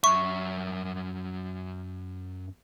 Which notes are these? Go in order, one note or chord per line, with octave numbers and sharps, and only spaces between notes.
F#2 E5 C#6